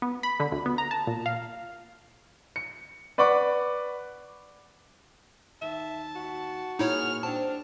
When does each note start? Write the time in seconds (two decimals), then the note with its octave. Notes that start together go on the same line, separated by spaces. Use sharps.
0.02 B3
0.23 B5
0.40 D3
0.52 D2
0.66 B3
0.78 A#5
0.91 A5
1.07 A#2
1.26 F5
2.56 C#7
3.18 B4 D5 F#5 B5 C#6 D6
5.62 D#2 E5 A5
6.16 F#4
6.79 A#2 D#4 E4 G#4 C#5 F6
7.23 C4 D4 A5